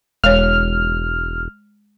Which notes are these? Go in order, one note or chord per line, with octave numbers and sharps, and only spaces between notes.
E1 G#3 C#5 F6